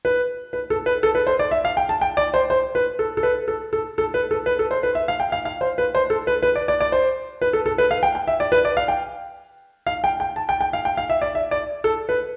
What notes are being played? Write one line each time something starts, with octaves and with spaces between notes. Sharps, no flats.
B4
B4
A4
B4
A4
B4
C5
D5
E5
F5
G5
A5
G5
D5
C5
C5
B4
A4
A4
B4
A4
A4
A4
B4
A4
B4
A4
C5
B4
E5
F5
G5
F5
F5
C5
B4
C5
A4
B4
B4
D5
D5
D5
C5
B4
A4
A4
B4
F5
G5
G5
E5
D5
B4
D5
F5
G5
F5
G5
G5
A5
G5
G5
F5
G5
F5
E5
D5
E5
D5
A4
B4